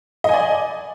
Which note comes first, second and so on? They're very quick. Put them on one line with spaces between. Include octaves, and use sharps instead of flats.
D#5 G#5 D5